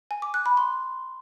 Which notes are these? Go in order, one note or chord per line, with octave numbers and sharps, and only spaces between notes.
G#5
D6
F#6
B5
C6